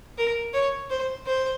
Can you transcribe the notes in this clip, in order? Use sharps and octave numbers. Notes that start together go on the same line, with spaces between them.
A#4
C#5
C5
C5